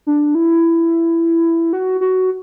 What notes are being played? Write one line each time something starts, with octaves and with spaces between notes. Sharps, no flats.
D4
E4
F#4
F#4